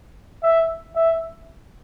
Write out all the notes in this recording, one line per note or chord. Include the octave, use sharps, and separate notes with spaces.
E5
E5